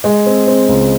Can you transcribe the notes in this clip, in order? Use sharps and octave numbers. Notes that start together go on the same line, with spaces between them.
G#3
C4
C4
C#2